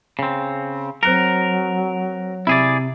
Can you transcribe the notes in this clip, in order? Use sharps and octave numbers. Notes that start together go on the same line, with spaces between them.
C#3 C4
F#3 C4 A#4 F#6 C#7
C3 E4 G#4 D5